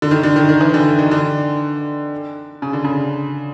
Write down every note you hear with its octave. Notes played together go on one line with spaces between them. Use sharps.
D3
D#3
D3
D#3
D#3
E3
D3
D#3
D3
C#3
D3
C#3